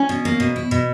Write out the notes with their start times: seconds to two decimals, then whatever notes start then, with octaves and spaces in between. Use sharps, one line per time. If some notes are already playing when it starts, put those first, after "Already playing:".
Already playing: C#4
0.09 B2
0.25 A#3
0.40 B2
0.56 E4
0.71 B2